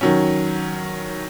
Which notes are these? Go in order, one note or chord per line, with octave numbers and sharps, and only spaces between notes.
D#3 F#3 C#4